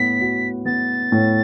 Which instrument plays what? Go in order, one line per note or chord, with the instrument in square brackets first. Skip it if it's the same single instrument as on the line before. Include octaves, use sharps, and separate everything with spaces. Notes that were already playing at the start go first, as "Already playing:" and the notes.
Already playing: [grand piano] A2 B3 [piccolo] B6
[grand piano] F#4
[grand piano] B3 [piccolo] A6
[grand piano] A2